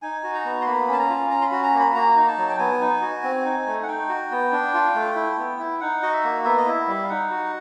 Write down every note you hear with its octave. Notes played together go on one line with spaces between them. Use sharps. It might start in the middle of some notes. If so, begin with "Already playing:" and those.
D#4 G#5
F#4
A#5
B3
C6
A#3 B5
C#4 A5
A#5
F4
C#4 A#5
C6
B5
F#4
A#5
A#3
B5
A#3 A#5
D#4 A#5
A5
F#3
G5
B3 G#5
D#4
F#4
C4
D#4
A3
F#5
D#4 G5
F#4
B3
D4
F4
A3
E4
B3
E4
D#4 F#5
F#4 D#5
E5
A#3
B3 E5
D#5
E4 E5
G3
F5
D#4 F#5
F#4